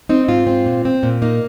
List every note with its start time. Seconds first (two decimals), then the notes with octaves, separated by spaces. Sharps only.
0.09 C4 D#4
0.28 G#2 F4
0.47 C4
0.66 A#2
0.85 C4
1.03 A#2
1.22 A#3 D#4